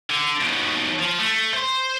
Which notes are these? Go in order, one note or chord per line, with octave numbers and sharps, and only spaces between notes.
D3
D#2 B2
F3
A3
C5 C6